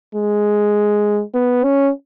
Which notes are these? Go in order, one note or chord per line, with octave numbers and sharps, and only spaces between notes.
G#3
B3
C#4